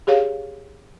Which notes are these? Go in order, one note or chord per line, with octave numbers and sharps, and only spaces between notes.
G4 G#4 C#5 F5